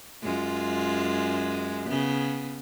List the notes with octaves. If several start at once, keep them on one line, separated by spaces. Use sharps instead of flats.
F#2 G#3 F4
C#3 B3